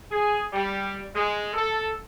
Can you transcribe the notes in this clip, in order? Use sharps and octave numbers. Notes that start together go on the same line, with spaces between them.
G#4
G3
G#3
A4